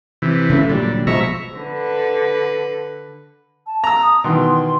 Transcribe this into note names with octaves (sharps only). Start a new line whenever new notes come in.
C3 E3
C#3 A3
A#2 D3 F#3 G3
B2 F3 G#3 E5 A#5 C#6
D3 B4
A5
A#5 E6
D#6
B2 D#3 E3 C6